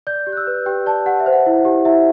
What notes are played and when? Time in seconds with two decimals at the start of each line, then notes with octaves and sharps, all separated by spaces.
0.07 D5 G6
0.27 G4
0.32 F#6
0.37 E6
0.47 B4
0.66 G4 G5
0.86 D5 A5
1.06 G4 F#5
1.20 E5
1.26 C5
1.33 F#5
1.46 E4
1.65 G4
1.85 E4 E5